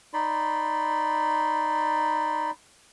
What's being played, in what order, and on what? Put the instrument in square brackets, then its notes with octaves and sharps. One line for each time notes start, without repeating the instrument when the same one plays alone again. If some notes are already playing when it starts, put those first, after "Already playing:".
[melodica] D#4 D5 B5 C6